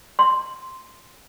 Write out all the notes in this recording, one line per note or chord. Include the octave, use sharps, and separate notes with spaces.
C6